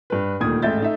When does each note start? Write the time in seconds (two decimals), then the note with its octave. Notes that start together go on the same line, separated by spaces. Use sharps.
0.10 G2 B4
0.40 D#1 D2 A#2 D#3 D#6 G#6
0.62 A1 G#2 A3 E5 G6 A6
0.80 A3 D#4 E5